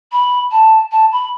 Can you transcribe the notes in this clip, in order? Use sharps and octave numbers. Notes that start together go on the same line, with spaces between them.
B5
A5
A5
B5